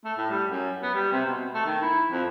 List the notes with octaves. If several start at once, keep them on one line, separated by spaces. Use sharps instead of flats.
A3
A2
G3
F#2
B3
G3
C3
B2
A3
D#3
E4
F2